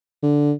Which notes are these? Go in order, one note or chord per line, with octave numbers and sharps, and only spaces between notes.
D3